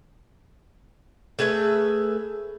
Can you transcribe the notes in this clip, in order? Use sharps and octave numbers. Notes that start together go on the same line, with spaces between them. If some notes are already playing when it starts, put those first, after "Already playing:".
A3 G#4 B4 E5